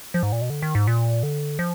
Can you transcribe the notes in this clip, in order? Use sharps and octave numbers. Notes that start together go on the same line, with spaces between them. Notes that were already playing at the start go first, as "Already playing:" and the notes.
F3
G#2
A#2
B2
D3
D#3
G#2
A#2
D3
F3